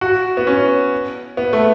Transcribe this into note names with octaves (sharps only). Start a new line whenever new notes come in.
F#4
B3
C#4
B3
A3